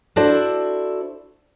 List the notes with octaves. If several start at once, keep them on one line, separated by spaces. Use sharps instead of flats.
D4 E4 F#4 A4 C5 D5